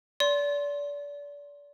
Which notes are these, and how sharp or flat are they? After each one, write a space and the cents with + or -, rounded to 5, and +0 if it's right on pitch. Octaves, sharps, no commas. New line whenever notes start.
D5 -30 C6 +10